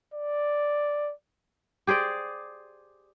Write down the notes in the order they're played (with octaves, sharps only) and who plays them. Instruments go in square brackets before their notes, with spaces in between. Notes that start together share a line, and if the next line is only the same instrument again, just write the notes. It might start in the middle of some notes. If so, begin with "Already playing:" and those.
[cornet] D5
[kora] G4 G#4 C5 D5